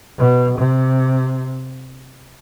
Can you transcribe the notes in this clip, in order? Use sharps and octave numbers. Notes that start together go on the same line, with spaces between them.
B2
C3